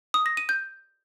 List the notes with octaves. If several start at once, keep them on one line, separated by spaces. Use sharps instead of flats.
D#6
A#6
D#7
G6